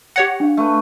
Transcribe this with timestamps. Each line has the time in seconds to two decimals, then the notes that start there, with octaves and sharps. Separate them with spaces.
0.16 G4 C#5 F#5 A#6
0.40 D4 F5
0.57 A3 B4